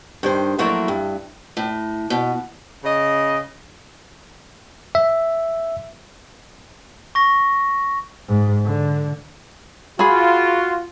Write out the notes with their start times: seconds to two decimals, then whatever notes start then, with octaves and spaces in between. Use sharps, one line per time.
0.23 G2 D#3 C5
0.58 F3 F#3 A3 A#3 E4
0.88 G2
1.57 A2
2.10 B2
2.84 C#3 D#5
4.95 E5
7.15 C#6 A#6
8.28 G#2
8.65 D3
9.99 F4 F#4 G#4 B5